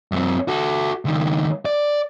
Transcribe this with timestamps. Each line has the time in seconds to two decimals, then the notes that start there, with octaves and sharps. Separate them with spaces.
0.12 F#2 C4
0.48 F#4 A4
1.05 C#2 D#3
1.65 D5